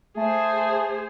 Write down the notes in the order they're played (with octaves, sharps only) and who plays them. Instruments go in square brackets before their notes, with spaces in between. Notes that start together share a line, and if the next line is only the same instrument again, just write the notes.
[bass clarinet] A3 [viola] G#4 C5